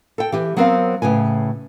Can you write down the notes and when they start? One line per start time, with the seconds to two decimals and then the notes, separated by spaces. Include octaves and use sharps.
0.18 A4 G5
0.32 E3 G4 G#5
0.57 F#3 B3 C4 A#4 C5 F5
1.02 A2 C#3 B4 G#5